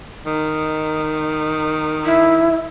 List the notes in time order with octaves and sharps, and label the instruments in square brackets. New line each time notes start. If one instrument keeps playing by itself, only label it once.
[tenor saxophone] D#3
[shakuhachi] E4